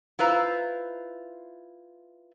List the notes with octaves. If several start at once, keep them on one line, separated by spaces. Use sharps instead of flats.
E4 F4 B4 C5 A#5